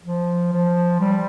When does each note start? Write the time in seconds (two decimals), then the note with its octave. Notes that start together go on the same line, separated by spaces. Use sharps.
0.05 F3
0.52 F3
1.00 G3